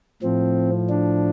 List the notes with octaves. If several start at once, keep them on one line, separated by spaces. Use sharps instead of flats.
A2 F3 C4
D4